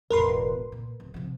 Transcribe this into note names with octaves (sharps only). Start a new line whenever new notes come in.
E1 A1 A#4 B4 C6
A#2
D1
C3 F3